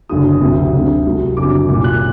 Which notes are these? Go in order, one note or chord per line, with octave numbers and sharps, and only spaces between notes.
F#1 F#2 D3 F#3 D#6
D2 C3 F#3
D2 D3 F#3
C2 C3 F#3
F#1 F#2 D3 F#3 D6
C2 A#2 F#3 D6
F#6